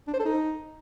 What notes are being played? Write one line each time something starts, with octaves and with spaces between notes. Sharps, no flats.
D4
C5
A4
D#4